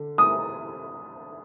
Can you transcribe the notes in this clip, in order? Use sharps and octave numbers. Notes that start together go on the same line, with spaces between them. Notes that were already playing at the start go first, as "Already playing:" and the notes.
Already playing: D3
D#6